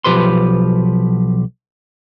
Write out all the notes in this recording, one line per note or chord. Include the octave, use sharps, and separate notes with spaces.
B1 F3 G4 B4 C6